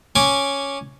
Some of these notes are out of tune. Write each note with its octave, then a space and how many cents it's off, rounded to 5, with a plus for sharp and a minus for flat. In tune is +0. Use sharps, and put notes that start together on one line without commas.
C#4 +0 G#5 +0 D6 +0